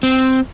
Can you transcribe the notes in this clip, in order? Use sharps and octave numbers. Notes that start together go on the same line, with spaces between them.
C4